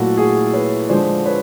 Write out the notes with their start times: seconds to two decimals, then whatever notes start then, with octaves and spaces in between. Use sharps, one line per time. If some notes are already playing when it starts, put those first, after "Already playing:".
Already playing: A#2 F#3 A3 E4 F#4
0.17 F#4 G#4
0.53 B4 C#5
0.89 D3 F3 G#3 C5 D5
1.26 B4 C#5